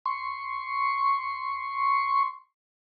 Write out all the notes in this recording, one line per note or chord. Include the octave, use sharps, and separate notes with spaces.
C6 C#6